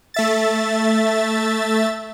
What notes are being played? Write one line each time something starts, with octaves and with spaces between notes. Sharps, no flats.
A3 E5 A6